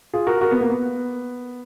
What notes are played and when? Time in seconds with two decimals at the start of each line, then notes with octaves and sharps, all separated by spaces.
0.13 F4 G#4
0.27 F#4 A#4
0.41 F#4 A#4
0.51 B3
0.61 A#3
0.70 B3